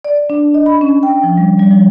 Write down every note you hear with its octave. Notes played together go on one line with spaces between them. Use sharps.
D5
D4
D#5
B5
C#4
G5
F3
G3
G3
F3